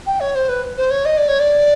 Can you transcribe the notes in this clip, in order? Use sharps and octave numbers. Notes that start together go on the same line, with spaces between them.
G5
C#5
C5
B4
C5
C#5
D#5
D5
C#5
D5